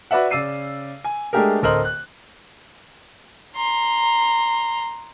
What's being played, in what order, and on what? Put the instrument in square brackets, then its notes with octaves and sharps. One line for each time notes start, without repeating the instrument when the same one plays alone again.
[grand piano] F#4 B4 D5 E5 F#5
C#3 D5 E6 C7 D#7
G#5
G#3 A3 D4 G4 G#4 A#4
D1 A4 A#4 C5 D#5 F#7
F#6
[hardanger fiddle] A#5 C6